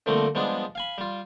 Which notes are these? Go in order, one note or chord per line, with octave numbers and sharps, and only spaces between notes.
D3 F3 G3 A3 A#3 C4
F3 G3 G#3 B3 D4 G#4
F5 G#5 B5
G3 F4